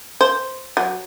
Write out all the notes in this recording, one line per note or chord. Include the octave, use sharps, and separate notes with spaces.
C5
F#3